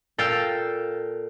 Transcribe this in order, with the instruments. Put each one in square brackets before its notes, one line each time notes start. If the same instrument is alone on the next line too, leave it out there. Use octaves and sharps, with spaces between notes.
[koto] A#2 A4 F5 G5 A5